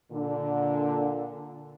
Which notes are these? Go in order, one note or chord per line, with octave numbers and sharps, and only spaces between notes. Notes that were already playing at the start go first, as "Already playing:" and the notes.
A#2 D3